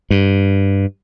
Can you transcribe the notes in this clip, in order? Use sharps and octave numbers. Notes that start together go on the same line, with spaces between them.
G2